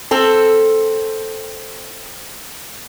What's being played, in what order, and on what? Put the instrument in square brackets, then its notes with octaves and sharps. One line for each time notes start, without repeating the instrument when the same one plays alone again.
[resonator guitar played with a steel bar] C4 A4